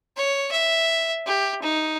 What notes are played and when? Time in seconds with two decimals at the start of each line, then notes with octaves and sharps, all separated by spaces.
0.17 C#5
0.52 E5
1.26 G4
1.62 D#4